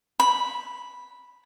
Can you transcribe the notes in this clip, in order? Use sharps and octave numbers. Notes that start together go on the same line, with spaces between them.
B5